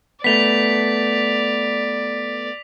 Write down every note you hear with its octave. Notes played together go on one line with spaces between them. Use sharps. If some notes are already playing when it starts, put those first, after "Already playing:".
A3 B3 D5 B6 F7